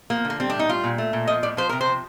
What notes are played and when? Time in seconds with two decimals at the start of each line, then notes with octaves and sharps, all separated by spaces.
0.10 F3 A#3
0.25 D3
0.30 A#3
0.40 G3 C4
0.50 A2 D4
0.59 D#4
0.69 G3 F4
0.84 A#2
0.98 A3
1.13 A#2
1.27 F3 D#5
1.43 A2 D5
1.57 F3 C5
1.69 C3 A#4
1.81 C5
1.87 F3